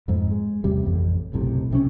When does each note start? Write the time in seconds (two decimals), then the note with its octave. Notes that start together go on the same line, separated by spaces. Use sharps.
0.08 F2 G#2
0.31 G#3
0.64 A1 E2 C3 G3
0.85 A1 F2
1.33 F#1 B1 A2 C3
1.71 B1 C3 E3 C#4